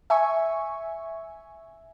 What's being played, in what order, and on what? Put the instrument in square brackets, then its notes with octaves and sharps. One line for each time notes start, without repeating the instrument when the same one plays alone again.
[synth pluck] E5 G#5 C#6